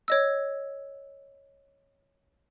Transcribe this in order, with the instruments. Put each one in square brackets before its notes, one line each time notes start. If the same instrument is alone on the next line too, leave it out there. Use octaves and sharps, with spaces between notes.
[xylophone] C#5 D#5 E6